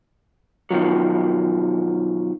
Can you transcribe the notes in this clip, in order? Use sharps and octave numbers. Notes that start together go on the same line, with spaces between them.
B2 D#3 F3 F#3